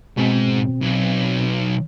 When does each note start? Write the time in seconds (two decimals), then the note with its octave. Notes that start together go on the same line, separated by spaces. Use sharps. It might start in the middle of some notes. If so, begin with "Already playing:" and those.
0.17 G#2 B2 C4
0.81 B1